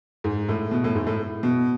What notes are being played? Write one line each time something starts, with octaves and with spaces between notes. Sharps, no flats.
G#2
A2
B2
A2
G#2
A2
B2